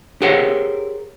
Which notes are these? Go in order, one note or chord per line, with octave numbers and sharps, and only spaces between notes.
G4 G#4 A#4 C5 C#5 F#5